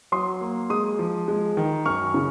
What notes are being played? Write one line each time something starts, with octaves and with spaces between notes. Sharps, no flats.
F#3 C6 D#6
A#3
G#3 C6 D#6
F3
G#3
D#3
F#2 C#6 F6
C#3